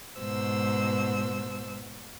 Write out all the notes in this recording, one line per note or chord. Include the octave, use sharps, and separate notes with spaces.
G#2 B2 C5 E6